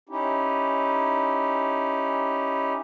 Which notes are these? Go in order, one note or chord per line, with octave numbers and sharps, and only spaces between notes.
C#4 D#4 E4 G4